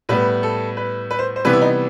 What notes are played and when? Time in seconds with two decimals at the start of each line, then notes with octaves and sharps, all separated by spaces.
0.09 A2 G3 B3 B4
0.43 A4
0.77 B4
1.11 B4
1.19 C5
1.36 C5
1.45 C3 E3 G3 B3 B4
1.53 E4
1.61 D#4